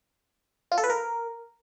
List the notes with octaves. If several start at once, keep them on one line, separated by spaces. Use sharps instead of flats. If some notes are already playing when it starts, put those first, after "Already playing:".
F4
A4
B4
A#4